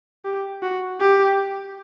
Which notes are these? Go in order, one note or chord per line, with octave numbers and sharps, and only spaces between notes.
G4
F#4
G4